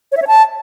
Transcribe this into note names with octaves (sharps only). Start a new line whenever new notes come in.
C#5
E5
C#5
A5